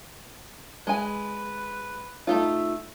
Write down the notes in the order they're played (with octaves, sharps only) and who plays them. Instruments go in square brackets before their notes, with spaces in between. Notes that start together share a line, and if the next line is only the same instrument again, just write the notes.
[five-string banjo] G#3 G#5 [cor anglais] B4
[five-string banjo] A3 D#4 F4 [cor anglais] E5